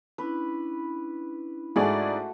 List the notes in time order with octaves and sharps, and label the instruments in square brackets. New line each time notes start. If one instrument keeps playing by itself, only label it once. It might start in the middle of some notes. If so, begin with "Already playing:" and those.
[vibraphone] C#4 D4 E4 [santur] B4
[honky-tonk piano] G#2 G#4 D5 [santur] A3 F#4